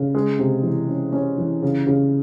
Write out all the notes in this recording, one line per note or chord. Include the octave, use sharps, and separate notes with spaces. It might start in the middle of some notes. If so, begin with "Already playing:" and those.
Already playing: C#3
G#3
C3
E3
C#4
C#4
E3
C#3
C#3